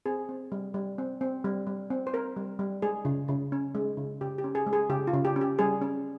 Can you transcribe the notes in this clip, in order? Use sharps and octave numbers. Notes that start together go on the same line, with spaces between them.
C4 G#4
C4
G3
G3
C4
C4
G3
G3
C4
C5
C4 A#4
G3
G3
G#3 G#4
C#3
C#3
C#4
G#3
C#3
C#3 G4
G4
C#4
G#4
G#3
G#4
C#3 G4
F4
C#3
G4
C#4
G4
G3 G#4
C#4